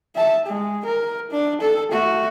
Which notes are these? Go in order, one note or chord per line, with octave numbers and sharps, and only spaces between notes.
E5 A5
G#3
A#4
D4
A4
A3 F#4